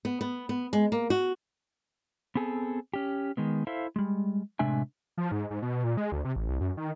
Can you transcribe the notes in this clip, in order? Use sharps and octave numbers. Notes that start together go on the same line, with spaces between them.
B3
B3
B3
G#3
A#3
F#4
B3 C4 G#4 A4
C#4 G4
D#3 G#3 B3
E4 A4 C5 E5 F5
G3 G#3
A2 C3 G#3 D4 E5 G#5
F3
G#2
G#2
B2
A#2
G#3
D2
C3
A1
C2
F#2
D#3